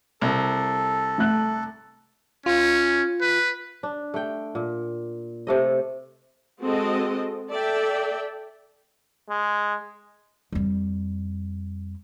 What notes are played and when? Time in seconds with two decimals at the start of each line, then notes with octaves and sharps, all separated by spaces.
0.22 C2 A4
1.18 A3 F#6
2.46 C#4 F4
3.21 B4
3.83 D4
4.14 A3 G5
4.55 A#2
5.47 C3 A3 D#5
6.64 G#3 C4 F#4 A4 D#5
7.50 A4 D5 E5 G5
9.30 G#3
10.52 F2 G3